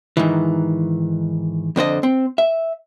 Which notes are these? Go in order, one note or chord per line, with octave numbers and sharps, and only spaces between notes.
G#2 D#3 E3
F2 D3 C5 D#5
C4
E5